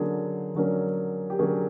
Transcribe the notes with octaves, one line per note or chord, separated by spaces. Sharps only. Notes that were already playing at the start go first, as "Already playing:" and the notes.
Already playing: D3 F#3 A#3 C#4 G#4
D3 F#3 A#3 C#4
G4
D3 F#3 A#3 C#4 G#4